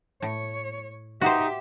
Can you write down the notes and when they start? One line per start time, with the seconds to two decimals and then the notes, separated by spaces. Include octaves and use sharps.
0.22 A2 C#5
1.21 D#4 F#4 G4 C5 E5